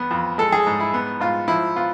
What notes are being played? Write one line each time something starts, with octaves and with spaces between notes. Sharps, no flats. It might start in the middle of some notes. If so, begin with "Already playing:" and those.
Already playing: E2 B3
F2
G#3 A4
G#4
G#2
E4
B3
G#2 F4
F3 E4
B3 F4